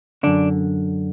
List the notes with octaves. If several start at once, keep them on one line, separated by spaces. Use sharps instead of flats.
F#2 D3 D4